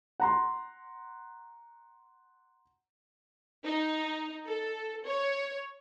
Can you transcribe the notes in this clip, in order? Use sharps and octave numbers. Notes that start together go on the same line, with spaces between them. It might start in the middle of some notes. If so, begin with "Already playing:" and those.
F#5 A#5 C6
D#4
A4
C#5